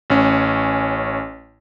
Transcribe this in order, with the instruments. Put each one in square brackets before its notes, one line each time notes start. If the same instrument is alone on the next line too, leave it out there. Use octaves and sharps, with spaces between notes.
[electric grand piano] A1 C#4